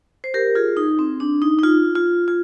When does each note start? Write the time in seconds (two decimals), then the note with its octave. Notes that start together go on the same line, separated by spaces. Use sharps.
0.24 C5
0.34 G4 A#4
0.55 F4 G#4
0.77 D#4
0.99 C4
1.20 D4
1.42 D#4
1.59 D#4
1.63 F4
1.95 F4
2.28 F4